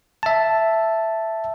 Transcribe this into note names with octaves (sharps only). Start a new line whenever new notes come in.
E5 A5